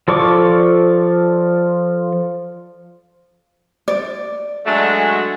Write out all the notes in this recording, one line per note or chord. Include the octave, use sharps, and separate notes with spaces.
F3 A4 D5 C#6 D6
D5
F#3 G#3 A3 D4 F#4